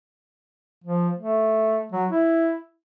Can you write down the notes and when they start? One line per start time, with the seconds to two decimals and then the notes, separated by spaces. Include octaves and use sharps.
0.84 F3
1.18 A3
1.92 F#3
2.11 E4